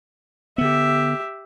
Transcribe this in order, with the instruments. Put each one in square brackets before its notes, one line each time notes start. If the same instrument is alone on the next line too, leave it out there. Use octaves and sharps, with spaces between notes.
[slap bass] D3 B3 [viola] G4 E5